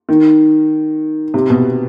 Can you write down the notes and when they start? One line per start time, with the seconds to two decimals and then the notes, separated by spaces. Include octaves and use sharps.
0.09 D#3
1.34 C3
1.50 B2